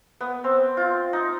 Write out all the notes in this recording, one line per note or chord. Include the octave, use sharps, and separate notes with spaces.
B3
C4
F4
D#4